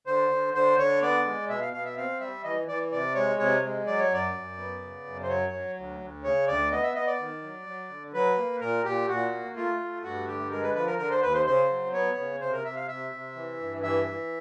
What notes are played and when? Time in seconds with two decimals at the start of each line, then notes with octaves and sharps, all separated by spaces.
0.07 D3 C5
0.31 D3
0.54 D3 C5
0.78 D3 C#5
1.02 B3 D5
1.26 G#3
1.49 B2 E5
1.61 F5
1.73 B2 F5
1.85 E5
1.97 C4 F5
2.20 G3 E5
2.44 E3 D#5
2.68 E3 D5
2.92 C3 D5
3.15 G#3 C#5
3.39 C3 C#5
3.63 G#3
3.86 F#3 D5
4.00 C#5
4.10 F#2 D5
4.34 F#2
4.58 B3
4.82 C#3
5.05 F#2
5.23 C5
5.28 F#3 C#5
5.53 F#3
5.76 D2
6.00 D2
6.24 C#3 C#5
6.48 D2 D5
6.71 B3 D#5
6.83 E5
6.95 B3 D#5
7.07 D5
7.19 D#3
7.42 F#3
7.66 F#3
7.90 D3
8.14 F#3 B4
8.37 A#3
8.61 A#2 A#4
8.85 A#2 G4
9.08 A#2 F#4
9.32 A#3
9.56 A3 F4
9.80 A3
10.03 G2 F#4
10.27 D3 G4
10.51 G#3 A#4
10.62 B4
10.75 F3 B4
10.87 A#4
10.98 D3 A#4
11.10 C5
11.22 D#2 B4
11.34 C5
11.46 C#3 C5
11.69 F#3
11.93 B3 C#5
12.17 C#3
12.41 C3 C5
12.53 A#4
12.64 C3 E5
12.76 F5
12.88 C3 E5
13.12 C3
13.36 E3
13.59 G2
13.83 E3 E5
14.07 E3